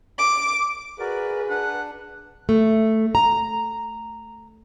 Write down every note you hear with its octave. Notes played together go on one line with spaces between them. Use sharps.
D6
F#4 G#4 A#4 B4 D5
D4 F#5
A3
A#5